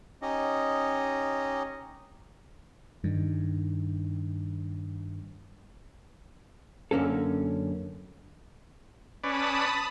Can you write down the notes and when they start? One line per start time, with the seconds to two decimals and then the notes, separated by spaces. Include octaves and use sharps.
0.22 C#4 D#4 G4 D#5
3.04 G2 D#3
6.91 F#2 D3 A#3 C#4 A4
9.24 C#4 B4 D5 A5 B5 D#6